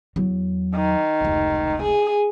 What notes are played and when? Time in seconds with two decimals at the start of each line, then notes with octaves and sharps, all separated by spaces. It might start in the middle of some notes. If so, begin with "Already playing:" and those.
0.16 E2 F#3
0.75 D#3
1.21 F1 C#2
1.83 G#4